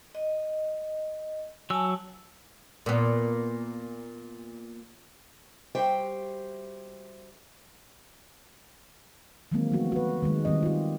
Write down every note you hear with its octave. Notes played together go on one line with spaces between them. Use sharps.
D#5
F#3 G#5 A5 E6
A#2 B3
G3 F#4 G4 C5 E5 G5
D#3 E3 F#3 G#3 A#3 C4
F3 F#3 A3 B3 F#4
F#4 B4
D#3 G#3
D#3 G3 C4 D#5
F4 G4